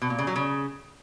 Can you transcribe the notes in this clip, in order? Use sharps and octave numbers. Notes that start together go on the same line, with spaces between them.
B2
A#2
C#3
F#3
C#3